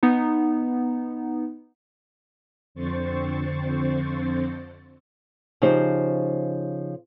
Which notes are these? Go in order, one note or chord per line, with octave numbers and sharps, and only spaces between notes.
B3 D#4
F2 D3 C4 C5 C#6 A6
C#3 F3 D#4 G4 C5